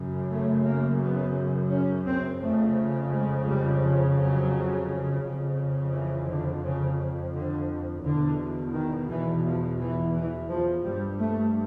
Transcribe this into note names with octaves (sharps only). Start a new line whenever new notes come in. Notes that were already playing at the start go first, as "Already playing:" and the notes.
Already playing: F#2 C#3
A3
A#3
B3
C#4
C4
F2 C#3 A3
G#3
G3
F3
F#3
F2 C#3
E3
D3
C#3
D3
E2 B2 D3
D#3
E3
F3
E3
E3
F3
G2 G3
A3